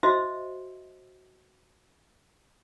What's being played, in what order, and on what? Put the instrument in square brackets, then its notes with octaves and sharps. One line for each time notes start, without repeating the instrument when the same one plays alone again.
[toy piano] F#4 C5 D#5 E5